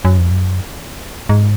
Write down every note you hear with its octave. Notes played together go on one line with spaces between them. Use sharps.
F#2
F2
F#2
G#2